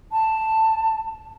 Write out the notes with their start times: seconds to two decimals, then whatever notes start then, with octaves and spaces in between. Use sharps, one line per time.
0.12 A5